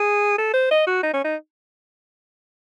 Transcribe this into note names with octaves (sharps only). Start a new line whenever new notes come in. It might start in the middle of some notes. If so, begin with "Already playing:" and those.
Already playing: G#4
A4
C5
D#5
F#4
D#4
C#4
D#4